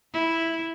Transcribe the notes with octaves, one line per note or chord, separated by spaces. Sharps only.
E4